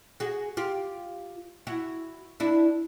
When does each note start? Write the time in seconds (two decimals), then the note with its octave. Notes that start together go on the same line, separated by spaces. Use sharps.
0.20 F#4 G#4
0.57 F4 G4
1.67 E4 F#4
2.40 D4 E4